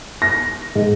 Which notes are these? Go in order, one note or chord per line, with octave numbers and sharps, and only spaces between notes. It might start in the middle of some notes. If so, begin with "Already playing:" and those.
A#6
G#2